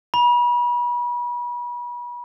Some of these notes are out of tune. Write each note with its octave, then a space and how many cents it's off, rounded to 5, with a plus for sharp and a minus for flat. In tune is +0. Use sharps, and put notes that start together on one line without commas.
B5 -35